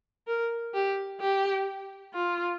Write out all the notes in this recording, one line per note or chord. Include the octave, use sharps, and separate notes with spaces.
A#4
G4
G4
F4